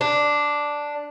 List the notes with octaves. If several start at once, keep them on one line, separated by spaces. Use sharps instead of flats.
D4